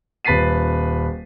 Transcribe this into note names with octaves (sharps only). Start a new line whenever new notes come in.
D#1 B4 A6 B6 C7 D#7